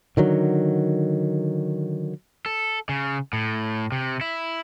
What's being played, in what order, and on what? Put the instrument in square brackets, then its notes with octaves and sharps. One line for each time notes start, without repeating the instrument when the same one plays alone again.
[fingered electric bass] D3 D#3 F#3
[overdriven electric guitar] A4
C#3
A2
C3
E4